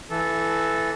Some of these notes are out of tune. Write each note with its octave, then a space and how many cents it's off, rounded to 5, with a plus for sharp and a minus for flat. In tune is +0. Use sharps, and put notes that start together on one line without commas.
E3 +10 A4 -10